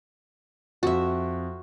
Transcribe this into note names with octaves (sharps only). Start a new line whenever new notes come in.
F2 F#4 E5